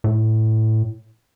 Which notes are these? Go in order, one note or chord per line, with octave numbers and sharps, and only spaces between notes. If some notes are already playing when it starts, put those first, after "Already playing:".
A2